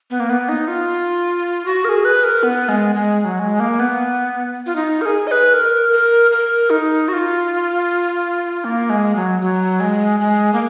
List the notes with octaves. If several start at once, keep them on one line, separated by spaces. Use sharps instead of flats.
B3
A#3
B3
D#4
F4
F#4
A#4
G#4
B4
A#4
B3
G#3
G#3
G#3
F#3
G#3
A#3
B3
F4
D#4
A#4
G#4
D#5
B4
A#4
A#4
A#4
D#4
F#4
F4
A#3
G#3
F#3
F#3
G#3
G#3
A#3